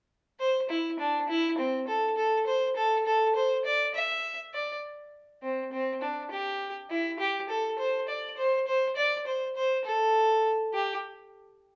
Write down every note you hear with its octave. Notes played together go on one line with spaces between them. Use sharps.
C5
E4
D4
E4
C4
A4
A4
C5
A4
A4
C5
D5
E5
D5
C4
C4
D4
G4
E4
G4
A4
C5
D5
C5
C5
D5
C5
C5
A4
G4